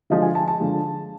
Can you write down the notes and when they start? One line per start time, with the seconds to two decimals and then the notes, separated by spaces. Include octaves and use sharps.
0.10 D3 F3 G#3 D#5
0.22 G#5
0.35 A5
0.48 A5
0.60 D3 F3 G#3